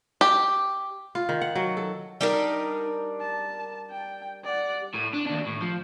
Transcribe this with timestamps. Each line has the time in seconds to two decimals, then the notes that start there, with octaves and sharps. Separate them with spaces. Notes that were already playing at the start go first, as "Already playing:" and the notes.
0.21 G4
1.15 F4
1.29 D#3
1.41 F#5
1.55 F#3
1.77 A4
2.21 G3 D4 D#4 A#4
3.20 A5
3.90 G5
4.44 D5 F#5
4.94 A2
5.13 D4
5.26 D#2 D4
5.46 A2
5.61 F3